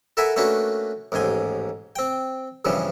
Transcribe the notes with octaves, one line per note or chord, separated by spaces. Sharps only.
A4 A#4 E5 F#5 G#5 B5
A3 A#3 C#4 D4 F#4 B4
A1 D#2 G#2 G#5 C6
C4 G5
E2 G2 C#3 E3 F3